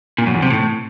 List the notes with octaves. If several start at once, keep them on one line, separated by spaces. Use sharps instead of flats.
A#2
F#2
E2
C3
A2